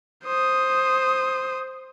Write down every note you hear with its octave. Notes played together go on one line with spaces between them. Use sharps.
C5 D#6